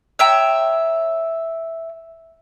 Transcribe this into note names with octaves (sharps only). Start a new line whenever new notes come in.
C#5 E5 G5 A#5